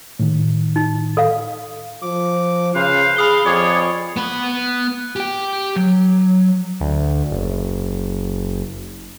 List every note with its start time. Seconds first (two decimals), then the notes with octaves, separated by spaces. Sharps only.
0.19 A2 D#3
0.76 D#4
1.17 A4 F5
2.02 F3 D6
2.75 C#3 B4 C5 F5
3.16 G#4 F5 B5 D#6 G7
3.45 F2 G#4 C#5 D5
4.17 B3 B5
5.16 G4 G5
5.76 F#3
6.80 D2
7.31 F#1